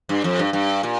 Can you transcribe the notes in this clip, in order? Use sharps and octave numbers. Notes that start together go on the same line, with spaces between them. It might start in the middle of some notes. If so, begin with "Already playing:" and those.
G2
F2
G2
G2
A#2